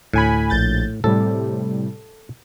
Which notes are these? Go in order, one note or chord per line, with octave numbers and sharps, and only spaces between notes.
D2 A2 G#5 B5
A#1 G6 A6
A2 C3 G3 A4